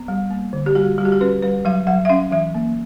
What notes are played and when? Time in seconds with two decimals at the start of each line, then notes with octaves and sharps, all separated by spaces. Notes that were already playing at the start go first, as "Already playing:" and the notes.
Already playing: B3
0.08 G3
0.31 A#3
0.53 D3
0.66 G4
0.75 G3 F#4
0.98 G3 F#4
1.05 G4
1.12 F#4
1.21 C#4 B4
1.42 G3 B4
1.65 F#3 F5
1.87 F#3 F#5
2.05 E5
2.09 C#4 F5
2.32 E3 E5
2.55 A#3